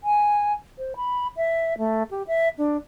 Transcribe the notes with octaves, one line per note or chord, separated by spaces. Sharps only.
G#5
C5
B5
E5
A3
G4
E5
D4